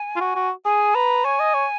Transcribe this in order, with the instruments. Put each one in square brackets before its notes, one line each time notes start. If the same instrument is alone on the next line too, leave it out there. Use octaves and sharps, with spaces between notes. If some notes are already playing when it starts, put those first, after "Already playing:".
Already playing: [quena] G#5
[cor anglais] F4
F#4
F#4
[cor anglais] G#4 [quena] G#5
[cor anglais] B4 [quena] A#5
[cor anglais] C#5 [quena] G#5
[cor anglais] D#5
C#5